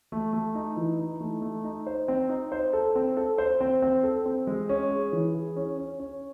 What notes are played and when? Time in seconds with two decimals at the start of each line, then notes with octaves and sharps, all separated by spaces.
0.12 A3
0.33 A3
0.55 D#4
0.77 E3
0.99 D#4
1.20 A3
1.42 A3
1.64 D#4
1.87 C5
2.08 C4
2.29 D#4
2.52 C5
2.73 A4
2.95 C4
3.17 A4
3.38 C5
3.61 C4
3.82 C4
4.03 A4
4.26 C4
4.47 G#3
4.69 C#4
4.91 G#4
5.12 E3
5.34 G#4
5.56 C#4
5.78 C#4
6.00 C#4